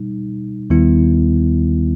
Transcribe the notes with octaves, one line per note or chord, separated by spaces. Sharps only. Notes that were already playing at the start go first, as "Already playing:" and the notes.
Already playing: B2 G3 D#4
D#2 D#3 G3 B3 E4